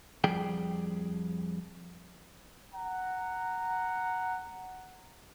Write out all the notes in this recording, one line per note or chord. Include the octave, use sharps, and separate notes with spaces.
F2 F3 G3 G#4 G5
F#5 A#5